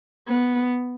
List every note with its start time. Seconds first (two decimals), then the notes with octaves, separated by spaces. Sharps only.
0.28 B3